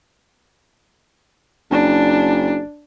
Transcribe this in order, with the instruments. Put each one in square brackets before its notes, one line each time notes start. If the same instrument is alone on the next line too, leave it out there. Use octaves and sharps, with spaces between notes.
[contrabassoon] F#1 [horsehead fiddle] D4